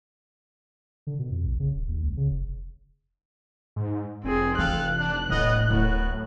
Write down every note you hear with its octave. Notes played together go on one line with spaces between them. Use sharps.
D3
B2
F2
A#1
C#3
D#1
D#2
C#2
C#3
F1
G#2
F1 C4 G#4
E3 A4 F5 G5 F#6
D4
D1 A#1 A2 B3 D#5
D1 B3 F#4 A#4